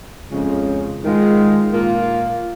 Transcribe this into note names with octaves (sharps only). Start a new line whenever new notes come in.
F2 C#3 G#3 C#4 F4
G#2 D#3 G#3 F4
A#2 A#3 F4